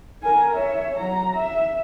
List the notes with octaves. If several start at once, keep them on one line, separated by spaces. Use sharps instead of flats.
A#4 G#5
C#5 E5
F#3 A#5
E5